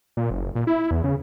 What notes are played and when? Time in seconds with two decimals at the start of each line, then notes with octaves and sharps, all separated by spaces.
0.17 A#2
0.31 F#1
0.55 A#2
0.67 E4
0.91 E2
1.04 C#3